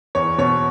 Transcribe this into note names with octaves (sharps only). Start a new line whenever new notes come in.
E2 C#5
B2 C#5